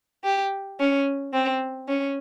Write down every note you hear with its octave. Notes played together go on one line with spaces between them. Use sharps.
G4
C#4
C4
C#4